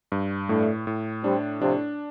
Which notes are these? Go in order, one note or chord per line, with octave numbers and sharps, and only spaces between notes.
G2
A2 A3 D4
A2
G3 C4 D4
C3 F3 D4